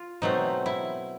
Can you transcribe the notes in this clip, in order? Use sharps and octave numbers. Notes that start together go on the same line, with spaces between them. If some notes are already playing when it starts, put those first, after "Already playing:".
Already playing: F4
B2 F#3 A3 C4 D#4
E4